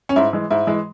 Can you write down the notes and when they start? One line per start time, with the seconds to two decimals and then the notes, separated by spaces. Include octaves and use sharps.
0.09 C#4
0.16 G#2 E4
0.33 E3 G#3
0.50 G#2 E4
0.67 E3 G#3